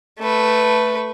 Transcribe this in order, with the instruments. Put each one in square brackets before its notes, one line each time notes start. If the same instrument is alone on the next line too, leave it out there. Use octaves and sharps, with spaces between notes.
[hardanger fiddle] A3 B4